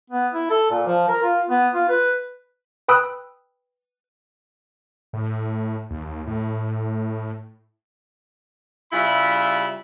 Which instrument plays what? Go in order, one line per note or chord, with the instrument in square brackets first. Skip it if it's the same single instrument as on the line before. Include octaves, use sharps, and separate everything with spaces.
[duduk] B3
E4
A4
A#2
F3
A#4
F4
B3
F4
B4
[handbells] B4 G5 B5 D#6 E6 F#6
[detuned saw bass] A2
D#2
D#2
A2
[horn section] C#3 G3 E4 F4 E5 B5